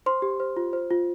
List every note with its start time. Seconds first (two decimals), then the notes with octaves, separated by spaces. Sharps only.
0.06 C5 C6
0.22 G4
0.40 C5
0.57 F4
0.73 C5
0.90 F4